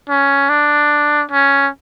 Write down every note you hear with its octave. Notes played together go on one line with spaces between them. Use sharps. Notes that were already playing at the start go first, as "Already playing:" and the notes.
C#4
D4
C#4